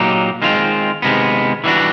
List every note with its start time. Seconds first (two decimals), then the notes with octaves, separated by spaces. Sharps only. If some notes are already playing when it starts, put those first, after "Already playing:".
Already playing: A#2 F#3 A#3 D#4 G4
0.42 D#3 G#3 C4 F4
1.02 C3 D#3 G#3 B3
1.64 E3 G3 B3 D4 F#4